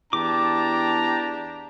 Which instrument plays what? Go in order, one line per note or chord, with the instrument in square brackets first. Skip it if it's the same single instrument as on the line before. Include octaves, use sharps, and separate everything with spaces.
[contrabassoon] E2 [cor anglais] D4 [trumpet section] G4 A5 A#5 [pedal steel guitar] D6